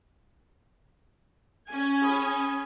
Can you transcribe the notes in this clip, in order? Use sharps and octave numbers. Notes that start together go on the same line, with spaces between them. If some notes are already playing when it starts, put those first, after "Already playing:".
C#4 G#5
G#4 B5 D#6